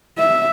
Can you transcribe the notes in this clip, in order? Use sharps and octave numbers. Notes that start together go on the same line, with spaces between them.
E5